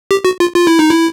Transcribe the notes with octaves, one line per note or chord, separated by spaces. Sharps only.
G4
F#4
F4
F4
E4
D#4
E4